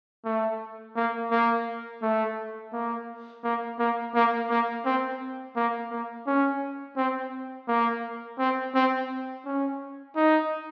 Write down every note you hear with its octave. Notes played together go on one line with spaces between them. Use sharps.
A3
A#3
A#3
A3
A#3
A#3
A#3
A#3
A#3
C4
A#3
A#3
C#4
C4
A#3
C4
C4
C#4
D#4